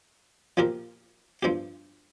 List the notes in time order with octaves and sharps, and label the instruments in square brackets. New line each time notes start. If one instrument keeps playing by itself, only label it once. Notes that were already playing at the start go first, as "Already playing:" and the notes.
[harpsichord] A#2 F3 C4 G4 A#4
G2 F3 C4 G4